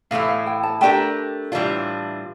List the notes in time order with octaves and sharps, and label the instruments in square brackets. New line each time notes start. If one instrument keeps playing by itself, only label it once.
[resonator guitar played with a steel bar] A2 E3 A3 E4 [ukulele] F5
[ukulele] F5
G5
A5
[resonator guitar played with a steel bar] A3 D4 G4 A#4 [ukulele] G5
[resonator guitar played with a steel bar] A2 E3 G3 D4 F4